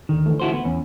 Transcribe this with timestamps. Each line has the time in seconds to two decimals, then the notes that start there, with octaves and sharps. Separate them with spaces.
0.09 D#2 D3 D#3
0.26 D3 E3 A3
0.40 E4 F#4 C5
0.53 B3
0.65 E2 C#4